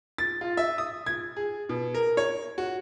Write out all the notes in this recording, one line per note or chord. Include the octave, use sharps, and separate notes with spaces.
A6
F4
E5
D#6
G#6
G#4
B2
A#4
C#5
F#4